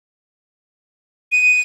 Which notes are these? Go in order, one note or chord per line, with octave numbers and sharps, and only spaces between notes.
D#7